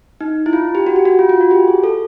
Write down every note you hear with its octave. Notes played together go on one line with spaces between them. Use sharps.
D#4
E4
F4
G4
F#4
G4
F#4
F4
F4
F#4
G4
G#4
A4